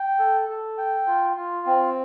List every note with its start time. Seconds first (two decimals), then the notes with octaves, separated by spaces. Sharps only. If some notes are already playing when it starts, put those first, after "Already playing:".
Already playing: G5
0.19 A4
0.49 A4
0.78 G5
1.07 F4
1.37 F4
1.66 C4